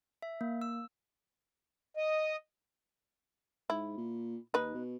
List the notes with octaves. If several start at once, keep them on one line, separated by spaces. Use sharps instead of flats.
E5
A#3
E6
D#5
G#2 E4
A#2
D#2 D#4 B4
B2